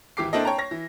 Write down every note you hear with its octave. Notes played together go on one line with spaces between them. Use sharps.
G#1 E3 G4 D6 C7
A#3 C4 D4 E4 A4 D#5
C#5 G5 A5 A#5
C#5 A#6
E3